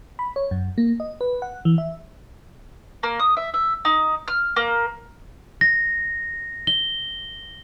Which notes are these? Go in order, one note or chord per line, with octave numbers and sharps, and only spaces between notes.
B5
C#5
F#2
A#3
D#5
B4
F#5
E3
E5
A#3
D#6
E5
E5
D#4
F6
A#3
A#6
G7